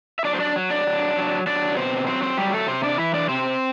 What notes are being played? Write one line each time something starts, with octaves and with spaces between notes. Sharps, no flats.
E5
F#3 D4 D5
C5
D4 D5
F#3
D4 D5
F#3
F#3
F#3 D4 D5
B2 C4 C5
F#3 C4 C5
C4 C5
F#3 G3 G4
A3 A4
C3 C4 C5
D4 D5
E3 E4 E5
D4 D5
C3 C4 C5